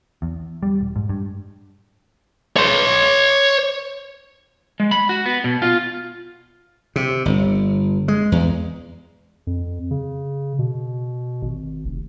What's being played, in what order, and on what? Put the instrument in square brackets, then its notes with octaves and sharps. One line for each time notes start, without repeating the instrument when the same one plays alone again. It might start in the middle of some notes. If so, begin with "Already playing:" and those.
[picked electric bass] E2
G3
E1
G#2
G2
[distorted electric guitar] C#5 C6
[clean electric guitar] G#3
B5
F#4
B3
B2
F4
[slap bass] C3
G1
G#3
E2
[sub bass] F2
C#3
B2
G#1
F1